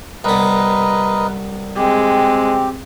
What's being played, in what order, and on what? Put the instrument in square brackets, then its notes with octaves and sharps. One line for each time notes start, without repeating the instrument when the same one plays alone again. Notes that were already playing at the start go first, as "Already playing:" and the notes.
[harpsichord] C2 B3 [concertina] A#4 B4 D#5
[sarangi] G#3 [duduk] C4 [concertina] G4